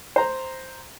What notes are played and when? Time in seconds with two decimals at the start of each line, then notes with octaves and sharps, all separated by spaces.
0.16 C5 A#5